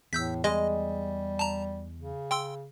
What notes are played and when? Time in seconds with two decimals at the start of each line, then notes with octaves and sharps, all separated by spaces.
0.13 E2 A2 E6 G6 B6
0.44 G3 G#3 D#5
1.39 A5 A#5
1.97 C#3
2.31 G5 C6 E6